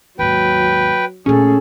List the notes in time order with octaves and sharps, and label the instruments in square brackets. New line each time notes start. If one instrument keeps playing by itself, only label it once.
[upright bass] D#2 G#2 [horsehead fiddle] F#3 [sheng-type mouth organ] B4 G5
[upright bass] A#2 A3 [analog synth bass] C#4 [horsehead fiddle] G#4 A4